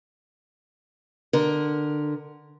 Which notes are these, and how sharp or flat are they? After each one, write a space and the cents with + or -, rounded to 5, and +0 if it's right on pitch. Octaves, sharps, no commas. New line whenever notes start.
D3 +20 A#4 +10